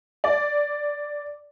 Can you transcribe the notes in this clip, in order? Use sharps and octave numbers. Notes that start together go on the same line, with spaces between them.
D5